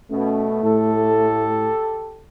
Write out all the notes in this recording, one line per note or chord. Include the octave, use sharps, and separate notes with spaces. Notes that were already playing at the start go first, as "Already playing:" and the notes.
B2 A3 C#4
A2 G4 A4